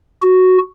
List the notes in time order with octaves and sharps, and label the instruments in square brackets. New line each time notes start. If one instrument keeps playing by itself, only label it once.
[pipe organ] F#4